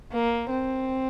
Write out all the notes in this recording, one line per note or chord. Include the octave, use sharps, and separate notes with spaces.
A#3
C4